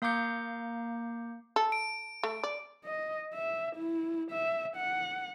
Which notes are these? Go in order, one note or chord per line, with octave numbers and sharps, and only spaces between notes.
A#3 F5 A#5 D6 G6 C#7
A4
D7
A3
D5
D#5
E5
E4
E5
F#5